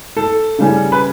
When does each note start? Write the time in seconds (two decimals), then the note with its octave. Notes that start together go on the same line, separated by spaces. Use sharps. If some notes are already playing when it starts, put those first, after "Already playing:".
0.17 A4
0.58 C#3 G3 C#4
0.92 B4